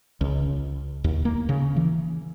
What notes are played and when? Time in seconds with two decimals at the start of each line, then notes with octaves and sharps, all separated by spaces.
0.21 C#2
1.04 D#2
1.25 A#3
1.49 C#3
1.76 E3